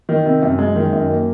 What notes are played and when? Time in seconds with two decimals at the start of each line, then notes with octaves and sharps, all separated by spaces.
0.09 D#3
0.25 C3
0.42 F#2
0.59 G#3
0.76 D#3
0.92 F#2
1.09 A#3